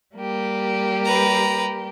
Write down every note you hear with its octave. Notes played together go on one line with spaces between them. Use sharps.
G3 A#3 G4
B4 A#5